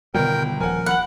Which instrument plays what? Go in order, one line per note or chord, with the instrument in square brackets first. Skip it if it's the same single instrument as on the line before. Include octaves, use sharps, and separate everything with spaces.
[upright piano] G1 [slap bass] B2 D#3 G3 [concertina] A#4 G5
[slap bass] D#1 F3 [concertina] A#4 [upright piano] F#5 G#5
[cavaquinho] F#5 [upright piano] B5 F#6 F#7